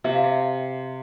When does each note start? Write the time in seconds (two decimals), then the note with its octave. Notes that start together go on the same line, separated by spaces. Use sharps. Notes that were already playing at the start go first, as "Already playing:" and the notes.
0.04 C3 E5
0.14 F5
0.24 E5